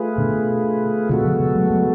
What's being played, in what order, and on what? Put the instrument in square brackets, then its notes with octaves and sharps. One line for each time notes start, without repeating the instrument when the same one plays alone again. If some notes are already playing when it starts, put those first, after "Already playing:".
Already playing: [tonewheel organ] A3 F4 G#4 B4
[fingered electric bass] B2 D3
[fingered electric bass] B2 D3 [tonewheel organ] G#3 B3 F#4 A4
[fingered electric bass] C#3 F3
C#3 F3
F#3 A3
F#3 A3